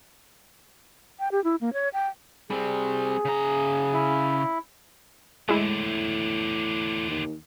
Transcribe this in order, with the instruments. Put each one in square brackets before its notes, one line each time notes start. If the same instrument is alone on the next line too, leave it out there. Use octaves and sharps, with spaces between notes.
[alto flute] G5
G4
E4
A#3
C#5
G5
[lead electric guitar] G3 C4 [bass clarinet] G#4
[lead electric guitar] C#3 A#5
[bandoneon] E4
[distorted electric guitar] E2 D3 [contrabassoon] A2 [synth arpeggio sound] G#3 E4
[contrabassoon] D#2